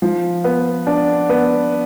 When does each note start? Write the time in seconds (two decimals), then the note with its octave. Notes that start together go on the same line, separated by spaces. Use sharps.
0.02 F3
0.44 B3
0.87 D4
1.29 B3